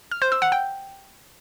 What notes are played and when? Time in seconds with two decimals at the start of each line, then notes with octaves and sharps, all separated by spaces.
0.11 F6
0.22 C5
0.32 E6
0.42 F#5
0.52 G5